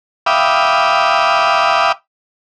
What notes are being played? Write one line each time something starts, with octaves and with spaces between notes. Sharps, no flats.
E5 F5 G5 B5 D6 D#6